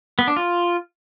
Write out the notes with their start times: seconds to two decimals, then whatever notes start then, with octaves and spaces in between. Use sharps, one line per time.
0.19 B3
0.28 D4
0.36 F4